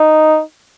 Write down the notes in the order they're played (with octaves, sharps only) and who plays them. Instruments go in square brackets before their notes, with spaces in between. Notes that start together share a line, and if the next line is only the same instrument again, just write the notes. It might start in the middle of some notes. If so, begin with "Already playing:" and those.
Already playing: [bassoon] D#4